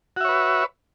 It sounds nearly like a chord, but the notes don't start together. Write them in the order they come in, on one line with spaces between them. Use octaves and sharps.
F#4 E5 C#5 B4